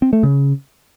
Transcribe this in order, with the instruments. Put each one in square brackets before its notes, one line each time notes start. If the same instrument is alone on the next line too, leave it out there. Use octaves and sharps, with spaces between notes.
[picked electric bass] C4
A3
C#3